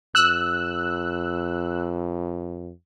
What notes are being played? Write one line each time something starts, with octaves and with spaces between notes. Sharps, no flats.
F2 E6 F#6